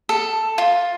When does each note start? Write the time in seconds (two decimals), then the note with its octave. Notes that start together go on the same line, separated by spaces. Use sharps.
0.09 A4
0.58 F4